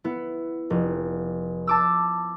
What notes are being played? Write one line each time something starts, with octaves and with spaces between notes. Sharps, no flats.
B3 E4
F1
A5 D6 E6